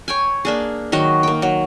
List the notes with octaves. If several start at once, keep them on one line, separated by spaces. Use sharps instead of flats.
C#5 G5 G#5
A#3 D4 G#4
D#3 F#3 F#4 D#5
A#3 G5
F#3